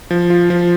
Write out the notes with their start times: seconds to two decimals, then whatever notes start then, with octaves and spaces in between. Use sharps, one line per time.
0.11 F3
0.30 F4
0.50 F3